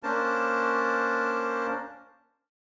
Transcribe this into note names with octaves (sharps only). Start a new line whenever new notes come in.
A#3 C#4 D4 A#4 C5 A5